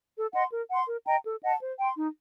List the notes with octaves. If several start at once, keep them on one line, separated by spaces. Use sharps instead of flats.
A4
D#5 F#5 C6
A#4
F#5 C6
A#4
D#5 G5 A#5
A4
D#5 F#5 A5
C5
G5 C6
D#4